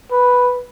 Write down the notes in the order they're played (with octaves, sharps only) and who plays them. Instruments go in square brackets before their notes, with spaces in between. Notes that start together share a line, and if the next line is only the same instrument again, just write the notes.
[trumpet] B4